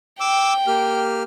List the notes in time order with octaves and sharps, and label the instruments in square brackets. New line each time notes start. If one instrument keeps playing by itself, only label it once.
[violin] G5 [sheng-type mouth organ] D6 E6
[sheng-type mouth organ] A#3 G4 F6